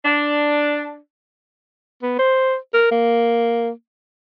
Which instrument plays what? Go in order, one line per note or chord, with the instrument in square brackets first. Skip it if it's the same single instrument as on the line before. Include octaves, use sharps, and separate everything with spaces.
[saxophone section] D4
[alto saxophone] B3
C5
A#4
A#3